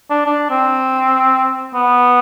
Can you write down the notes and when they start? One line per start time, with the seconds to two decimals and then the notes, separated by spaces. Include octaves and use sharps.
0.10 D4
0.26 D4
0.50 C4
1.74 B3